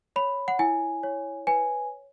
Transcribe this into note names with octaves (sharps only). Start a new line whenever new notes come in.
C#5 B5
F#5
E4 G#5
C#5
B4 G#5